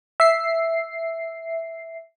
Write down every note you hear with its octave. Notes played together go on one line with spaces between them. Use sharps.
E5 C7